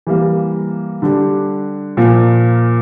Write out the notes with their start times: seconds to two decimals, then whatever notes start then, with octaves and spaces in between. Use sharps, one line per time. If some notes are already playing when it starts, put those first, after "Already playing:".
0.07 E3 G3 A#3
1.02 D3 G3 D4 G4
1.97 A#2 F3 A#3